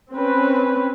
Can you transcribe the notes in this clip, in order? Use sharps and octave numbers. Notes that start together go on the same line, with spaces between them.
C4 C#4 B4